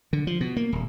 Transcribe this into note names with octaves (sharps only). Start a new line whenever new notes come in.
D3
F3
B2
A#3
D#1